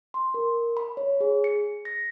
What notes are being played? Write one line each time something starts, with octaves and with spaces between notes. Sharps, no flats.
C6
A#4
B5
C#5
G#4
C#7
A#6